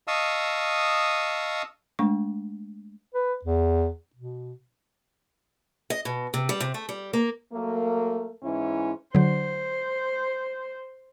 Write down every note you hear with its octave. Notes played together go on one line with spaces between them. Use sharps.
D#5 F5 A5 C#6 D#6 E6
G#3 A3 D4 C#6
B4
E2
B2
D#5
B2
C3
G3
C3
A3
G3
A#3
F#3 A3 A#3
G#2 E3 C#4 E4
D3 F#3 C5